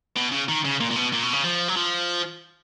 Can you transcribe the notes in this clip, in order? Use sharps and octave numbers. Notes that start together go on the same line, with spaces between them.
B2
C#3
D#3
C#3
A#2
A#2
B2
A#2
B2
C#3
F3
F#3
F3